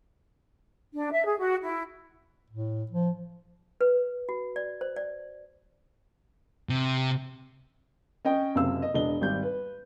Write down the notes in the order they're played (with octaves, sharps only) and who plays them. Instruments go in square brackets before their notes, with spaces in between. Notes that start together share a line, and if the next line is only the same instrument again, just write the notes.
[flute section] D4
E5
G#4
F#4
E4
[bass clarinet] A2
F3
[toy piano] B4
F#4
D5
C5
D5
[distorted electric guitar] C3
[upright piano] C#4 D#5 G5
F#1 F#2 C3 F5 E6
D#5
E1 D4 D#5 G7
G#1 G3 G6
B4